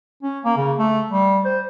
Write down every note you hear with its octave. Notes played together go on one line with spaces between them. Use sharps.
C#4
A#3
C#3
A3
G3
C5